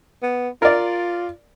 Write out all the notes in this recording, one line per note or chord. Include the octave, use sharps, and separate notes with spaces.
B3
F4 A#4 D5